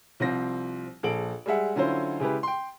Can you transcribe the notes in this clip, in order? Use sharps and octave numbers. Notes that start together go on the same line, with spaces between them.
C2 F3 C4 A#6
A#1 G#4 A4 D7 F#7
G3 G#3 G#4 E5 F#5
D3 F#3 C#4 E4 F4 C5
C#3 G#3 E4 G4 G#4 B4
G5 C6